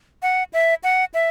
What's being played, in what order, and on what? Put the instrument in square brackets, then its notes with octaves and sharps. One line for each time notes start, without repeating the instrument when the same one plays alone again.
[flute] F#5
E5
F#5
E5